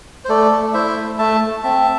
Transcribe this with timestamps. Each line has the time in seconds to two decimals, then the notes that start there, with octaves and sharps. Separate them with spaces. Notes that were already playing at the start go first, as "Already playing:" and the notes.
0.25 C5
0.29 A3 A4 D5
0.52 A3
0.73 E4 C5 E5
0.96 A3
1.18 A3 E5 A5
1.41 A3
1.63 C4 E5 A5